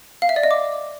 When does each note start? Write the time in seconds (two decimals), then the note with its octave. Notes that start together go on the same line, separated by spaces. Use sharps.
0.22 F5
0.29 E5
0.36 D5
0.43 D#5
0.51 D6